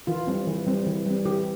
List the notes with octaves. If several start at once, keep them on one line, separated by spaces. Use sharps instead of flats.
E3 F4
G3 C4
E3
G3 C4
E3
G3 C4
E3 G4